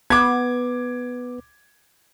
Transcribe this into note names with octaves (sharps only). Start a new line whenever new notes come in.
B3 D6 G#6